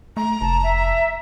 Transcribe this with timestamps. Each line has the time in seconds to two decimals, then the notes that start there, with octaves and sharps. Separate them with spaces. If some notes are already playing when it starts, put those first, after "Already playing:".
0.17 A3 A#5
0.41 F1 A5
0.64 E5